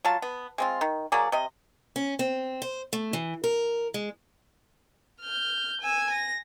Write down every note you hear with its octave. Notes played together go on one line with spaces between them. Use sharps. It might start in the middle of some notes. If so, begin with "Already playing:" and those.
F#3 F4 A5
B3
G#3 C4 F4
D#3
F#3 A#3 G#4 D5
C3 D#5
C#4
C4
C5
A3
E3
A#4
G#3
F6 G6
G#5 E6
A#6